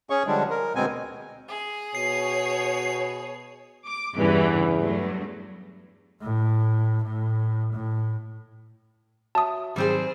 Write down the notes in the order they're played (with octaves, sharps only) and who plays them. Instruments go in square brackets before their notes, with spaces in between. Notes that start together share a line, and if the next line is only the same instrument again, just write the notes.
[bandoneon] C#4 G#4 C#5 C#6
D3 F3 G3 G#3 D4
A#4
D2 B2 G#3 B3 C4 G#5
[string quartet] G#4
[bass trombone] B2 [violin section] C#5 [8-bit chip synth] C7
[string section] D6
[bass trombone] E2 [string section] G2 C#3 E3
[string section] G2 F#3 A3
[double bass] A2
A2
A2
[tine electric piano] F#4 C#5 E5 [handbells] A5 D#6
[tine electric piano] G#2 D#3 F#3 [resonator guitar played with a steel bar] G3 C4 G#4 [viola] C5